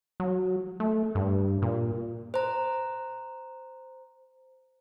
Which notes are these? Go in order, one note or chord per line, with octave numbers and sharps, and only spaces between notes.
F#3
A3
G2
A#2
C5 A#5